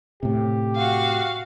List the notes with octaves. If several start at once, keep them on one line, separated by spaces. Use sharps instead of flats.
A2 C3 G4
F#4 F5